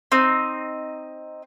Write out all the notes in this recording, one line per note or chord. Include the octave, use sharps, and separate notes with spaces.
C4 D#4